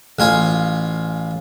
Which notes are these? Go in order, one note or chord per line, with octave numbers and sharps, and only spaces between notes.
A1 F4 G#5